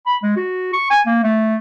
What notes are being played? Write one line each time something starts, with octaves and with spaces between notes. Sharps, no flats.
B5
G#3
F#4
C#6
G#5
A#3
A3